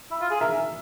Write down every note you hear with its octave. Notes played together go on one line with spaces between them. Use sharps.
E4
F4
G#4
A#4 E5